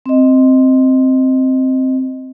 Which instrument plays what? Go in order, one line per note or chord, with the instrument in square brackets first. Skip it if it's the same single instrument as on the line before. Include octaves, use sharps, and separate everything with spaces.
[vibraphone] C4 D#5